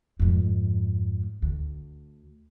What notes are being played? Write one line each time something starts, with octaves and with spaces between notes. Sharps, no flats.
F2 G#2
D2